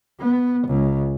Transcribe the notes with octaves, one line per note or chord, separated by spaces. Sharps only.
B3
C#2